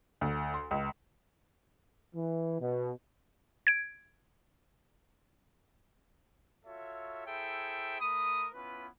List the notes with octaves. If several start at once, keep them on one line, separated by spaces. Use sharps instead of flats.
D2
C6
C#2
E3
B2
G#6 D7
F4 F#4 A4 C#5 E5
E4 G#4 A4 C5 E5 G5
A3 A#4 B5 D#6
B3 C#4 E4 F4 B4